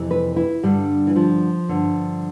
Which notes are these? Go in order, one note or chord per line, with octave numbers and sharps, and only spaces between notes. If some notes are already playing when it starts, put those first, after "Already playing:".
Already playing: F2 C3 E3
B4
E4
G2 D3 G3
E3
F3
G2 D3